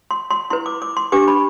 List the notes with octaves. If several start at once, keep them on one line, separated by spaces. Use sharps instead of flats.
C6
C6
E4 B4 C6
D6
D6
C6
D4 G4 B4 D6
B5